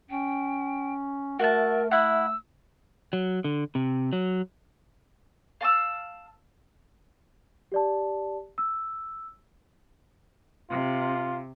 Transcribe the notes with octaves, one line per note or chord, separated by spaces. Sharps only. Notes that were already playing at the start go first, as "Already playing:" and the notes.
C#4 G5
A3 F#4 A#4 E5 A5
E4 F#5 E6
F#3
D3
C3
F#3
F5 A5 C6 E6
G4 D5 A5
E6
C3 F4